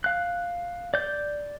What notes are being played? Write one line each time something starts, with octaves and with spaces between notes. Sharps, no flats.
F5 F#6
D5 G6